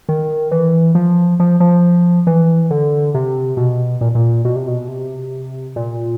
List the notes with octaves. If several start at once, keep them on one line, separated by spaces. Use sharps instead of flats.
D#3
E3
F3
F3
F3
E3
D3
C3
B2
A#2
A#2
B2
C3
B2
C3
A#2